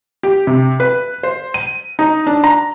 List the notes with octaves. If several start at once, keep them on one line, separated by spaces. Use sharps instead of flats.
G4
C3
B4
C5
D#7
D#4
D4
A#5